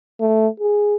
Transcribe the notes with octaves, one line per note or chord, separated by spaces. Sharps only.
A3
G#4